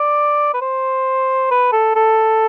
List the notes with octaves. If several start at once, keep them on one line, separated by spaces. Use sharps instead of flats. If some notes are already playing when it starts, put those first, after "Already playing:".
Already playing: D5
B4
C5
B4
A4
A4